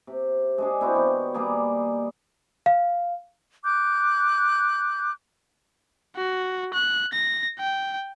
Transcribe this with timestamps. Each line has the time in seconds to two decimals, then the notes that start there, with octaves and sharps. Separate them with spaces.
0.07 C3
0.58 G#3 D4 G#4
0.81 C4 E4 F#4 G4
0.95 D#3 B3
1.34 G3 A#3 G#4
2.66 F5
3.63 D6 F#6 G6
6.16 F#4
6.74 F#6
7.13 A#6
7.59 G5